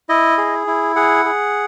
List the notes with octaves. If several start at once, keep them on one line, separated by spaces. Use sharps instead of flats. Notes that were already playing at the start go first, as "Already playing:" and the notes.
E4 D#5
G#4
E4
G#4 F#5
G#4